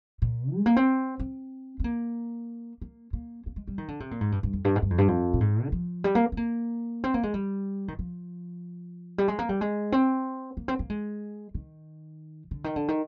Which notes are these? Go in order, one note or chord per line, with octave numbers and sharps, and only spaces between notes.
A#2
G#3
A#3
C4
C4
C4
A#3
A#3
A#3
A#3
G#3
G3
D#3
D3
C3
A#2
G#2
G2
G2
F2
G2
G#2
G2
F2
G2
F2
A#2
G#2
D#3
F3
G3
A#3
C4
A#3
C4
A#3
G#3
G3
D#3
F3
G3
G#3
A#3
G3
G#3
C4
A#3
C4
A#3
G#3
D#3
D3
D#3
D3
D#3